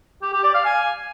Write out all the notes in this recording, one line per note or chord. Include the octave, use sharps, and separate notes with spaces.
G4
G4
D5
F5
G#5